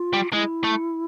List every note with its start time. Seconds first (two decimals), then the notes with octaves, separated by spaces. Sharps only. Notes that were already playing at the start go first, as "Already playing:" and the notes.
Already playing: F4
0.13 G3
0.33 G#3 E4
0.64 A3